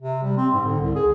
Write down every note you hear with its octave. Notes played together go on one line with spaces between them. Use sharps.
C3
G3
C4
G#2
D3
C2
G#4